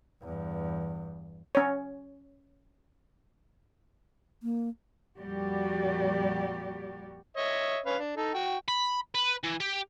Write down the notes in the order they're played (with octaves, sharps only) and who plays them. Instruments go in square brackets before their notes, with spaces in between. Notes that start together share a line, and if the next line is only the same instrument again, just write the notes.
[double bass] E2 G2
[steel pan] C#4 C#5
[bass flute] A#3
[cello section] F2 A#2 G3 F#4 G4 D5
[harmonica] C#5 D#5 E5
C#4 B4 F5
D4
D#4 A4
F#4 G5
[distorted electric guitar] B5
B4
E3
G4